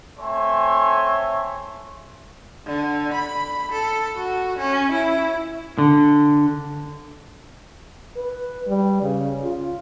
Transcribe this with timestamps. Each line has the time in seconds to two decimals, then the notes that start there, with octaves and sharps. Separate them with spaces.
0.18 A3 C4 C#5 E5 G#5 C6
2.66 D3
3.14 B5
3.72 A4
4.15 F#4
4.59 C#4
4.92 E4
5.78 D3
8.17 B4
8.68 G3
9.02 C#3
9.43 F4